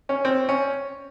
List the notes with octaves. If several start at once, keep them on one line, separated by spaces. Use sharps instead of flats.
C#4
C4
C#4